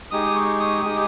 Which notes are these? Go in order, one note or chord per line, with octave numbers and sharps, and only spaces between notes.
G#3 D#4 G4 D#6
C#6
D#6
G#3 D#4 G4 D#6